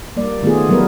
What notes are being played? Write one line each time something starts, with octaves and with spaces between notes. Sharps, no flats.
G3 A#3 D5
D#3 A3 B3 F4 G#4
E3 F#3 G3 B3 A#4 B4